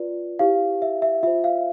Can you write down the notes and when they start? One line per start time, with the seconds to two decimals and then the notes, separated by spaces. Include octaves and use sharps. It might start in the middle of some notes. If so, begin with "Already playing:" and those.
Already playing: F4 B4 D5
0.39 E4 G4 C5 F5
0.82 E5
1.02 E5
1.23 F4 C5 E5
1.44 F5